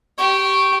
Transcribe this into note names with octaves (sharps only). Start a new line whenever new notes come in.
G4 C#6